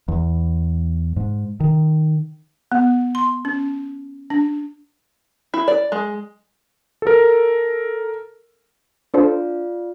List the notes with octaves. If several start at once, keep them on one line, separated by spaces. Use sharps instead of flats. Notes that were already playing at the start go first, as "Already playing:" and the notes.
E2
G#2
D#3
B3
C6
C#4
D4
E4
D5
G#3
A4 A#4
D4 F4 A4 C5 D5 F5